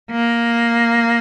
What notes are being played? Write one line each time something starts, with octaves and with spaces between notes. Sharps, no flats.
A#3